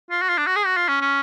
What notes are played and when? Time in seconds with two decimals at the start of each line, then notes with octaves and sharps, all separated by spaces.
0.11 F4
0.22 F#4
0.29 F4
0.38 D4
0.47 F#4
0.56 G#4
0.66 F#4
0.77 F4
0.88 C#4
1.01 C#4